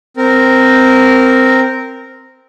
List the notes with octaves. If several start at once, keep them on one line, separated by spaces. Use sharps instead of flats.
C4 A#4